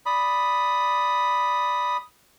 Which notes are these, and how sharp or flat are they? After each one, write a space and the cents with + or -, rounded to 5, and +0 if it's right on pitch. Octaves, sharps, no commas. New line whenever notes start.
D5 +0 B5 +0 D#6 +0